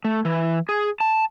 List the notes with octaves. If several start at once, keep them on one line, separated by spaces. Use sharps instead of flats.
A3
E3
G#4
A5